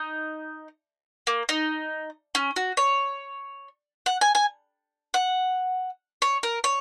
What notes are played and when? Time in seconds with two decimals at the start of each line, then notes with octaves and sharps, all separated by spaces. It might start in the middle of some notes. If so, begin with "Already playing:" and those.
Already playing: D#4
1.27 A#3
1.49 D#4
2.35 C#4
2.56 F#4
2.77 C#5
4.06 F#5
4.21 G#5
4.35 G#5
5.14 F#5
6.22 C#5
6.43 A#4
6.64 C#5